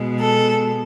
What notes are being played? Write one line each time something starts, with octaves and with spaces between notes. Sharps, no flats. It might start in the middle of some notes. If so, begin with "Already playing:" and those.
Already playing: B2 G#3
A4